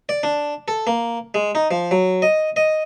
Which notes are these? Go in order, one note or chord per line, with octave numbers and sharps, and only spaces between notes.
D5
D4
A4
A#3
G#3
D#4
F3
F#3
D#5
D#5